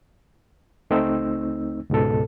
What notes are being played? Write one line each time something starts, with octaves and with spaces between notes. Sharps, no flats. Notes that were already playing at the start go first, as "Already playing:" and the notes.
C#2 A3 C4 D#4 E6
C#2 G#2 B2 A4